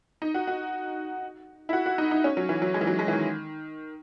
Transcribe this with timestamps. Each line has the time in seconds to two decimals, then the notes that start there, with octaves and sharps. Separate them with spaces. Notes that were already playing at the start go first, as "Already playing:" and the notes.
0.22 D#4
0.34 F#4
0.47 F#4
1.69 E4
1.73 F#4
1.86 F#4
1.98 D#4
2.11 D#4
2.24 C#4
2.37 F#3
2.49 E3
2.62 F#3
2.74 G#3
2.81 E3
2.87 F#3
2.99 G#3
3.08 E3
3.12 D#3